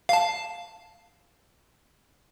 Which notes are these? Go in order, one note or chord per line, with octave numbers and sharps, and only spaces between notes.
F5 A5